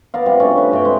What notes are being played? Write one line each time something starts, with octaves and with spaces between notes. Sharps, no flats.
B3 A#4 D5 F5
C3 G3
B2 A3 C#4 D4
B4
G2 C3 C#5 G5
G#3